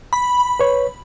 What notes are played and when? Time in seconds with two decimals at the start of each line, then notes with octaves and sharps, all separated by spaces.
0.13 B5
0.59 B4 C#5